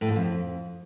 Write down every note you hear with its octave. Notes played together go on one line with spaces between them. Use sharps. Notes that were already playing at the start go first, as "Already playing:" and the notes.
A2
G#2
F2